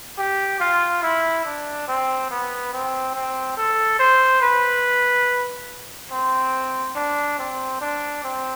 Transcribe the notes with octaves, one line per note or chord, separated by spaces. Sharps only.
G4
F4
E4
D4
C4
B3
C4
C4
A4
C5
B4
C4
D4
C4
D4
C4